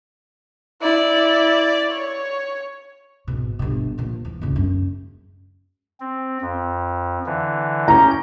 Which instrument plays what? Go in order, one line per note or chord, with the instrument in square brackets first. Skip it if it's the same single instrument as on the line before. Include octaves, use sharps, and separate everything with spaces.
[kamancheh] E4 D5
C#5
[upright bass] G#1 B2
G1 B2
A#2 F3
E2
G#1 C#2
F#2 G#3
[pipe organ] C4
F2
D3 E3
[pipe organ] C#4 G4 G6 [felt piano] A#5